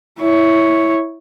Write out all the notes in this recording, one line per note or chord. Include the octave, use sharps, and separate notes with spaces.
E4 C#5